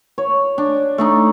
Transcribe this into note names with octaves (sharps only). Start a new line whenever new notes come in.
C#5
D4
A3 D4 D#4